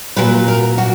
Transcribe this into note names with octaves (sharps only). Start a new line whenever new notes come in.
A#2 F#3 B4
A#4
F#4